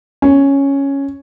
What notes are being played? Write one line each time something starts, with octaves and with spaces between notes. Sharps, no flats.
C#4